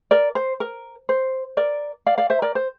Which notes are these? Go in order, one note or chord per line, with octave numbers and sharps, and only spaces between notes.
A#4 D5
C5
A#4
C5
A#4 D5
D5 F5
D5 F5
C5 E5
A#4 D5
C5